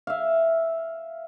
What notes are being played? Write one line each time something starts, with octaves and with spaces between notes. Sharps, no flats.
E5 F5